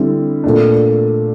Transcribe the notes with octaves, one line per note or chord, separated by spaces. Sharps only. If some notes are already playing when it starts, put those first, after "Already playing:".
Already playing: D3 G3 C4 E4
A#2 A3 D4